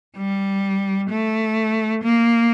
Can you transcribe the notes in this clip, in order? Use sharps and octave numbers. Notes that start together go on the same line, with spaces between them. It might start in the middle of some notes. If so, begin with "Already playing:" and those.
G3
A3
A#3